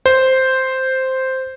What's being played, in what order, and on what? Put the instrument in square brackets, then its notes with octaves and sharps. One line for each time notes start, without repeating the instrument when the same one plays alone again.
[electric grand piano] C5